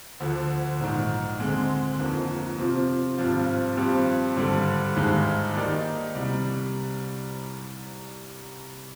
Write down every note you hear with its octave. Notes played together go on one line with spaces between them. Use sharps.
D2 D3 F3
A#1 G#2 D#3
D2 D3 G#3 C4
G1 F2 D#3 A#3 D4
C3 F3 C4 F4
G#1 G2 F3 C4 F4
G2 F3 C4 G4
G#1 G2 D3 G3
G#1 G2 D#3 G#3 D#4
D#3 A#3 D#4 G4 D5
C2 C3 G3